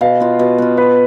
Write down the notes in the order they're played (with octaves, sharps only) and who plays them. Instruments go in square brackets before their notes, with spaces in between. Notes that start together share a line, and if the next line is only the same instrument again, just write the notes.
[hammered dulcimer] B2 [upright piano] F5
[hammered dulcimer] B3 F4
B2
B3 F4
[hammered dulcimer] B2 [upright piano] B4